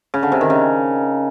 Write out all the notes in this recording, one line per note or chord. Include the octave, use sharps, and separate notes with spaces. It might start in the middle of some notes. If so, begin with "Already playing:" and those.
C#3
D3
C3
D#3
C#3